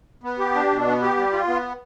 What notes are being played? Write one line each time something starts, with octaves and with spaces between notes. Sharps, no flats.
B3
G4
D4
B2
B3
G4
G3
F4
B3